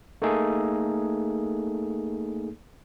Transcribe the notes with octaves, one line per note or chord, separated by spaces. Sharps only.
A3 A#3 D#4 G#4 A4